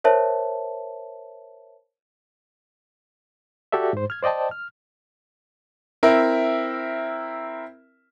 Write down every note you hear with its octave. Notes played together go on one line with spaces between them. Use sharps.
A#4 C5 C#5 E5 A5
F#4 G4 A4 D5 E5
G#2 C5
F6 G#6
C5 D5 D#5 G5 A5
F6
C4 E4 A#4 E5